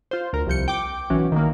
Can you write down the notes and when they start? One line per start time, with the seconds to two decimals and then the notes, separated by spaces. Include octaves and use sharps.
0.11 F4 C5
0.33 D2 A#4
0.47 C2 F3 G6 C#7
0.68 G5 D6
1.10 B1 E3 C#4 F#4
1.32 D#3 A#3